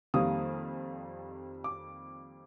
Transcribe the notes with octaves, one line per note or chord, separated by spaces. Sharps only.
F2 D#3 G3 A#3 D#6
D6